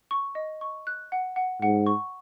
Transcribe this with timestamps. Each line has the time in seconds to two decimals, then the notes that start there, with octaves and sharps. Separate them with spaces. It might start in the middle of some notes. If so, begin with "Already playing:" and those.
0.11 C#6
0.35 D#5
0.61 C#6
0.87 F#6
1.12 F#5
1.36 F#5
1.62 G#2 F#5
1.86 C#6